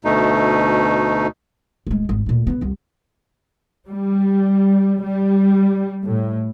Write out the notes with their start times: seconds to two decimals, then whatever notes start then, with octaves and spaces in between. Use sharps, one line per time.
0.05 D2 B2 A3 D#4
1.87 D1 G#3
2.09 G#1 E2
2.26 D2 A#2
2.47 C#3 B3
2.61 C2 F2
3.89 G3
5.03 G3
6.05 A2